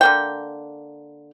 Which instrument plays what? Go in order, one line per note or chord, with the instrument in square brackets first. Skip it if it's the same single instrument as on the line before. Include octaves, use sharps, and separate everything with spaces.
[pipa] D3 A#3 G5